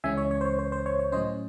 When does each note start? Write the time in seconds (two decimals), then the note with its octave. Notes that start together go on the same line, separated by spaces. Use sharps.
0.04 C#2 C#3 E3 G#3 C#4 E5 G#5
0.17 C#5
0.31 C#5
0.41 C5
0.45 C#5
0.59 C5
0.72 C5
0.86 C#5
0.99 C#5
1.12 A2 F#3 C#4 C5 D#5